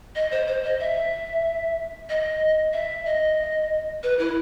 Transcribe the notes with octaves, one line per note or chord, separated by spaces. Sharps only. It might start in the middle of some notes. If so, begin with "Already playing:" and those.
D#5
C5
C5
D#5
E5
D#5
E5
D#5
B4
E4